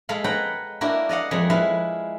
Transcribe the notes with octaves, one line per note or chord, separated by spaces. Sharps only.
G#3 A4 F5 B5
B4 C#5 F#5 G5 A#5
A#3 D4 E4 F#4 G4 A#4
D5 D#5 F5 F#5
F2 G#3 G#4 B5
G#3 E4 B4 F5